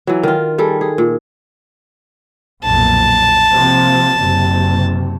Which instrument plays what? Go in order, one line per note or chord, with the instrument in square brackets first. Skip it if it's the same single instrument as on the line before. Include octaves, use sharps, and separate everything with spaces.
[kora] E3 F#3
D#3 F4
G3 G#4 A4
G#4
A#2
[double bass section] B1 F2 A#2 [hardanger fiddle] A5
[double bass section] C3 F3 A#3
F#1 C3